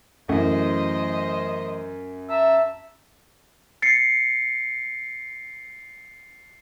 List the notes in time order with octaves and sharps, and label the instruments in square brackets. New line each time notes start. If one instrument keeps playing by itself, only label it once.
[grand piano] F#2 [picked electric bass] E3 A3 [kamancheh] C5 D#5
[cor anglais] E5 [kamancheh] A5 A#5
[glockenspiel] A6 C7 C#7